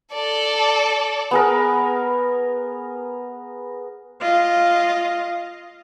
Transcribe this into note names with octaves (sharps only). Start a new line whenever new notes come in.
A4 D5
B3 G#4 A#4
F4 D#5